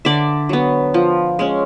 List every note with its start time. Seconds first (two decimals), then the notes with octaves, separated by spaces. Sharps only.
0.05 D3 D5 E5
0.49 F#3 B3
0.94 F3
1.39 G#3 C#4